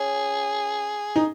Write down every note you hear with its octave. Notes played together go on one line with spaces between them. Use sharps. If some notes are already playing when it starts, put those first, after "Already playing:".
Already playing: C#4 G#4
D#4